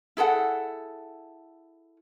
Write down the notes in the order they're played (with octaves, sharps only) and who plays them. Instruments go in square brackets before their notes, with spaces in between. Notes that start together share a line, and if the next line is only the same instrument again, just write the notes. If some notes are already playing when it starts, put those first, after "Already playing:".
[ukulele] E4 G#4 A4 F#5